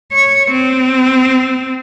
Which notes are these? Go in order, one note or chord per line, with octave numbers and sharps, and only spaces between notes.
C#5
C4